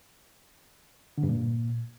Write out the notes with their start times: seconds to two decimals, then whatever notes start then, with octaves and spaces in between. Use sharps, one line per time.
1.18 D3
1.23 G2
1.29 A#2